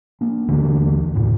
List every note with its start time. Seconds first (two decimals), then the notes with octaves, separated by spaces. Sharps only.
0.21 A#3 D4
0.48 D#2 D3 E3
1.15 F#2 A2 C#3